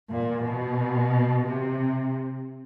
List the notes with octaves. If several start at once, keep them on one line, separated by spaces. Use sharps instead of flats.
A#2
B2
C3